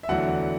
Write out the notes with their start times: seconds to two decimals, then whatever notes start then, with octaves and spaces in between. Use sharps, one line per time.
0.03 E5
0.08 E2 D3 F#3 A3 E4 F#5